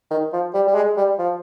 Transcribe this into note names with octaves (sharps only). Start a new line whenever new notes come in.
D#3
F3
G3
G3
G#3
G3
F3